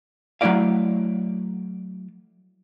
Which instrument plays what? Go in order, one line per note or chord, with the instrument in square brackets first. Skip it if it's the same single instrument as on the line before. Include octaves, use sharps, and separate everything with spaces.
[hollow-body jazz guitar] F#3 A3 D4 E4 D5 F5